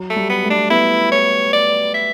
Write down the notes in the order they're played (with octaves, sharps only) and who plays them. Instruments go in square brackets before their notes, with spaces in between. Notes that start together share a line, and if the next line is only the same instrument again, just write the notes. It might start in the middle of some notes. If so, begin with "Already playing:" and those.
Already playing: [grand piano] F#3
[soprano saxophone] A3
[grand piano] G3
[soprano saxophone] B3
[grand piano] A3
[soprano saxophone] D4
[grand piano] B3 [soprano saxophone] E4
[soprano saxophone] C#5
D5
E5